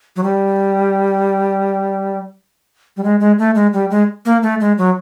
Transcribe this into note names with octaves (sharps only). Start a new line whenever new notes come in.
F#3
G3
G3
G#3
G#3
A3
G#3
G3
G#3
A#3
A3
G#3
F#3